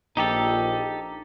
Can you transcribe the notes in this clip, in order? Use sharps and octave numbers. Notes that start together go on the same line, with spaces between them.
A#1 D#4 G4 A4